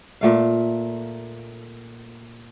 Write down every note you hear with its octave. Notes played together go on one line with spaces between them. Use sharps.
A#2 A3 F5